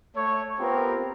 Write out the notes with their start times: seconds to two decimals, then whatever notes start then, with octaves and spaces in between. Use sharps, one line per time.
0.15 A3 C#5
0.59 B3 C4 F4 G4 A#4